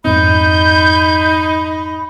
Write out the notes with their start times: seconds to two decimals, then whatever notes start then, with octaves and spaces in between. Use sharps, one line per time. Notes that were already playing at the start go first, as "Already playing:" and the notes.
0.05 F2 G#2 C4 D#4 B5 G6